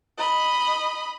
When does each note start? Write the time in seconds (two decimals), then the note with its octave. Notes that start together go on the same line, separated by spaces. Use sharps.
0.18 D#5 B5